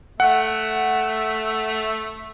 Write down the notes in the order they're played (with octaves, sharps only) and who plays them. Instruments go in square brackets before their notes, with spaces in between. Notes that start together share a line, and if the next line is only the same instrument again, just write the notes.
[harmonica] A3 E5 [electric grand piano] F#5